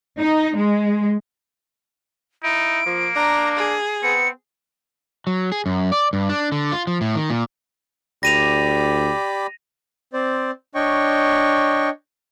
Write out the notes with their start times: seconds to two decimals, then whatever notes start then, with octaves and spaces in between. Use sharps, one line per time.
0.19 D#4
0.56 G#3
2.44 D#4 E4 D7
2.86 F3 A#3
3.16 D4 A#5
3.57 G#4
4.03 B3 C4 C#7
5.27 F#3
5.52 G#4
5.66 F#2
5.92 D5
6.13 G2
6.29 D4
6.52 D3
6.72 F4
6.87 F3
7.01 A2
7.16 D#3
7.30 A#2
8.23 D2 G4 D5 B5 A#6 D#7 F7
10.13 C4 C5 D5
10.75 D4 C#5 D#5 G5 C#6